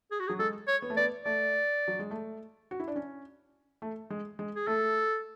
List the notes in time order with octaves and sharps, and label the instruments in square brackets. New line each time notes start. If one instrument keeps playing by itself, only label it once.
[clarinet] G#4
F#4
[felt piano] F#3 [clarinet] G#4
[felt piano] G#3 [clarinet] A4
[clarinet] C#5
[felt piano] B3
A3
[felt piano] B3 [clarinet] D5
[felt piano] A3 [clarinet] D5
[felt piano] F#3
G#3
A3
F#4
E4
D4
C#4
A3
G#3
G#3
[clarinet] G#4
[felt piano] A3 [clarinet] A4